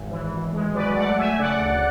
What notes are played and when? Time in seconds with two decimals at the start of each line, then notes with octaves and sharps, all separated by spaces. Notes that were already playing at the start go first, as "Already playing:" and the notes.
Already playing: G#1
0.10 E3
0.32 G#1
0.53 G#3
0.74 F#3 B4 D5
0.96 A3 D5 F#5
1.18 A3 E5 G#5
1.39 C#3 D5 F#5
1.60 D2